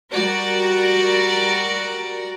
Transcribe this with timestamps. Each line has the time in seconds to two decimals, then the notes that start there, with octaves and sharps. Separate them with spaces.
0.11 G3 F#4 A#4 D5